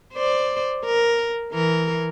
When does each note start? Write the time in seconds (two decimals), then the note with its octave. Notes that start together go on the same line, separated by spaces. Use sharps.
0.14 C5 D5
0.86 A#4
1.51 E3 A#4